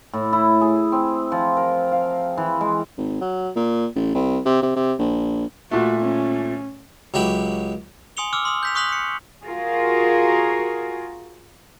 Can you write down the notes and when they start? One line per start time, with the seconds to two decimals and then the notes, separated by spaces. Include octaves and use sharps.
0.13 A2
0.33 E4
0.61 G#4
0.92 C4
1.32 F3
1.57 A#4
1.92 F5
2.38 E3
2.61 G#3
2.98 G#1
3.21 F#3
3.56 A#2
3.96 A1
4.15 C2
4.45 C3
4.62 C3
4.76 C3
4.99 A#1
5.71 A#2 A3 F#4
6.01 C#4
7.14 C#2 F#3 G4 E5 B5
8.17 G#5 C6 D#6 C#7 F7 G7
8.33 D6 E6 F6
8.45 C6 D#6 E6
8.63 G6 B6 F7
8.75 C#6 D#6 F#6 B6 F7 F#7
8.89 D#6 C#7
9.45 F4 F#4 G#4 A#4